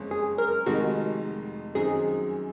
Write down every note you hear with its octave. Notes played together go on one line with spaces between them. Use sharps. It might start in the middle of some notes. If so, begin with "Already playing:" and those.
Already playing: F#1 F2 G#3 C#4
G#4
A#4
F1 F2 C3 D#3 G#3 F#4
F#2 D#3 F#3 C4 D#4 G#4